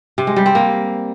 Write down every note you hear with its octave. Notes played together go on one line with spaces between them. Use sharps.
C3
G#3
G3
C4
A#3